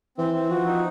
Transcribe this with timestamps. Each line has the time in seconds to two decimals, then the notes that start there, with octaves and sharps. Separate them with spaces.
0.18 E3 C4
0.34 C4
0.49 F3 F#4
0.66 D#4